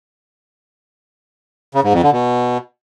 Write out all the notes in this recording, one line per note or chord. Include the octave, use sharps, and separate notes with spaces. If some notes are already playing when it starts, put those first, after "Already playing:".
C#3
G#2
F2
D3
B2